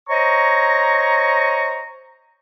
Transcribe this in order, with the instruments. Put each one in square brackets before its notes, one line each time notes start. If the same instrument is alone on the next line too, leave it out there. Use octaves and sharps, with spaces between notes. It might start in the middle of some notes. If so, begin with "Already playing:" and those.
[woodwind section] C5 C#5 D#5 A#5 C#6